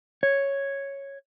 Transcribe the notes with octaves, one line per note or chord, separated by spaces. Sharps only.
C#5